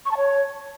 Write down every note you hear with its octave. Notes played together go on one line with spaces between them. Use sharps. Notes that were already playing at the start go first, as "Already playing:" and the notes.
C#6
A5
C#5